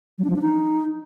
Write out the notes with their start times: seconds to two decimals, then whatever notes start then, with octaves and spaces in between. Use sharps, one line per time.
0.18 F#3
0.24 D4
0.30 F3
0.36 D4
0.42 D#4